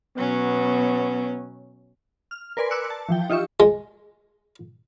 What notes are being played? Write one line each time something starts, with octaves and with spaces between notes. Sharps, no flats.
B2 F#3 B3 C#4
F6
A#4 B4 D5 G#5 C6
D6 E6 F#6 C#7
A5
E3 F3 G5
D#4 F4 G4 E5 C#6
G#3